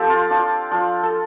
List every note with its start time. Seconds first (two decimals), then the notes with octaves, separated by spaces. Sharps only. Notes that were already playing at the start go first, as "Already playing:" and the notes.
Already playing: F3 C4 G4 A4
0.10 F4
0.30 F3 D4 F4
0.71 F3 D4 F4
1.03 A4